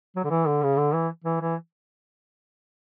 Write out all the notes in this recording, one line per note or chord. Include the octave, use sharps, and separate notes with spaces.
F#3
D3
E3
D3
C#3
D3
E3
E3
E3